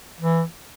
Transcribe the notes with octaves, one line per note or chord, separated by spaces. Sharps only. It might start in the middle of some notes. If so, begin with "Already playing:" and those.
E3